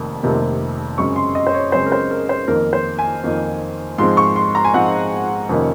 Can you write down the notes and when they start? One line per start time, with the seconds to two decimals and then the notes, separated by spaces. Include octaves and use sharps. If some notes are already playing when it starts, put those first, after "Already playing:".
Already playing: F1 F2 C3 D#3 A#3
0.23 F1 F2 C3 D#3 A#3
0.98 F#2 C#3 G#3 C4 C#6
1.16 C6
1.35 D#5
1.47 C5
1.54 C#5
1.72 F#2 C#3 G#3 C4 C5
1.86 A#4
1.92 C5
2.11 A#4
2.29 C5
2.48 F2 D#3 A#3 A#4
2.73 C5
2.99 G#5
3.23 F2 D#3 A#3
3.98 G#2 F3 G#3 C4 C6
4.17 C#6
4.36 C6
4.55 A#5
4.65 G#5
4.74 G#2 F3 G#3 C4 F#5
5.49 F2 C3 D#3 A#3 C#4